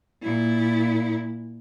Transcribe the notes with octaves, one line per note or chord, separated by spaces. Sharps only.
A#2 E4